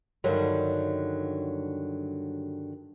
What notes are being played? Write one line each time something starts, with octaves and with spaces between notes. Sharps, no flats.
G2 D3 D#3 F#3 G3